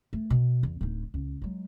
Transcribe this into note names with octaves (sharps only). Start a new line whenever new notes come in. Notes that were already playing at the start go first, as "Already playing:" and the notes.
A3
B2
E2
D1 D#4
C#2
F#3 G#3